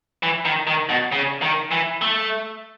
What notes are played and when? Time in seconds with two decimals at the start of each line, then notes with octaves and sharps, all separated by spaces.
0.23 E3
0.45 D#3
0.67 D#3
0.89 B2
1.12 C#3
1.42 D#3
1.71 E3
2.01 A3